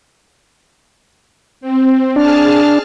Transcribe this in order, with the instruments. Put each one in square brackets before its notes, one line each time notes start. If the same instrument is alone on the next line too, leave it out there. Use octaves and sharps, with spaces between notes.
[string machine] C4
[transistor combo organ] D4 [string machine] G#4 A5 F6